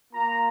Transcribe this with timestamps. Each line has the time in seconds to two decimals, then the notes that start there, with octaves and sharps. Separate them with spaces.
0.12 A#3 F4 A#5